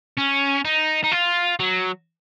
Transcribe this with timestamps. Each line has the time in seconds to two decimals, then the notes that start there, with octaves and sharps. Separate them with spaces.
0.18 C#4
0.65 D#4
1.04 D#4
1.12 F4
1.60 F#3